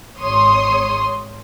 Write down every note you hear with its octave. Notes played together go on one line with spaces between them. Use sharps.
G#1 C#5 C6 D#6